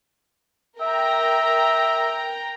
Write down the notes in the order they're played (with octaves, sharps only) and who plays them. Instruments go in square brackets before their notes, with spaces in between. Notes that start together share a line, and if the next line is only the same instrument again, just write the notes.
[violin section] A#4 G5 A#5 [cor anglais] E5